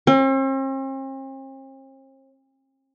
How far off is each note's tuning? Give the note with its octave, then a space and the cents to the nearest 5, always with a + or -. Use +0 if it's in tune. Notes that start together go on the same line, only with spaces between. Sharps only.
C4 +45